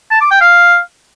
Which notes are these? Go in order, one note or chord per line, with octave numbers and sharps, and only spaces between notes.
A5
D6
G5
F5